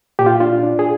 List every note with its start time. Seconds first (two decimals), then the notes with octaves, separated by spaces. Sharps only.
0.19 A#2 G4
0.26 F4
0.40 D4 F4
0.63 D4
0.79 G#4